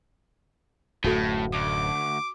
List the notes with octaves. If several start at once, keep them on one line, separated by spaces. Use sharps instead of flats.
D1 F#2 A2 D#4 F#4 A4
D2 D6